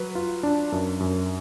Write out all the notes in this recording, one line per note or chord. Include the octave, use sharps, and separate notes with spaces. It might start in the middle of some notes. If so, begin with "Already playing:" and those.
Already playing: F#3 B4
F4
D4
F#2
F#2